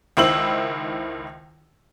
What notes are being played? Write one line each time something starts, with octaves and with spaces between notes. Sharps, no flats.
C#2 D#3 E4 C5 E6 F#7